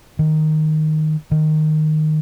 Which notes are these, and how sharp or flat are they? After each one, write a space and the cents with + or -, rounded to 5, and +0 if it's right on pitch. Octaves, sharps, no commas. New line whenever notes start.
D#3 -5
D#3 -10